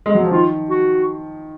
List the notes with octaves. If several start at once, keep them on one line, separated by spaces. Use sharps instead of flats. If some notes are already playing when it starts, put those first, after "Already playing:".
G#3
F#3
F3
D#3 F4
F#4